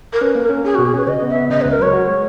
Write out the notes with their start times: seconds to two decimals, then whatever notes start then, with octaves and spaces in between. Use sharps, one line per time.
0.13 A#4
0.21 C#4 B4
0.35 A#3
0.43 A#4
0.49 C#4
0.64 C#4 G#4
0.75 F#4
0.78 B2
0.86 G#4
0.94 C#4 B4
1.07 C#3 D#5
1.22 B3
1.29 E5
1.36 B3
1.50 C#3 D#5
1.61 B4
1.65 C#2
1.72 A#4
1.80 F#3 C#5
1.93 F#4
2.08 G#3